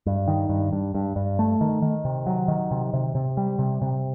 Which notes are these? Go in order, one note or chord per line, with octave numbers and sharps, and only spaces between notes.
G2
D#3
G2
G2
G2
G2
A3
D#3
D#3
C3
F#3
D#3
C3
C3
C3
G3
C3
C3